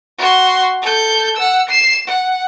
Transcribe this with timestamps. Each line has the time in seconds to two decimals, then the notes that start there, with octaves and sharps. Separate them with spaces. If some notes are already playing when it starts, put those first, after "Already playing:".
0.18 F#4 C6
0.82 A4 G6
1.36 F#5 E6
1.69 C7 E7
2.07 F#5